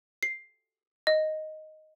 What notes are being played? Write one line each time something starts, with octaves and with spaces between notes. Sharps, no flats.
C7
D#5